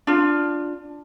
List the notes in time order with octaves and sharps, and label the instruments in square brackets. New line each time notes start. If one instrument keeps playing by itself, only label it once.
[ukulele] D4 F4